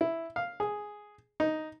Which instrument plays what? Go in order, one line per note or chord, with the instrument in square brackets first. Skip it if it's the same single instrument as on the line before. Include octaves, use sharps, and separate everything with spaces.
[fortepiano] E4
F5
G#4
D#4